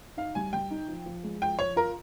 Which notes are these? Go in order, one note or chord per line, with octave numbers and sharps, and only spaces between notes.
D#4 F5
G3 G#5
G3 G5
D#4
F3
F3
G#3
F3 G5
F3 C#5
F4 A#4